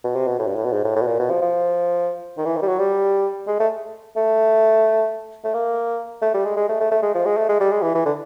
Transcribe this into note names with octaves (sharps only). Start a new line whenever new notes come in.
B2
C3
B2
A2
G2
A2
B2
G#2
A2
A2
B2
A#2
B2
F3
F3
D#3
E3
D#3
G3
F#3
G3
G#3
A3
A3
A3
A#3
A3
G3
G#3
G#3
A3
A3
A3
G#3
F3
G#3
A3
G#3
G3
G#3
E3
E3
D3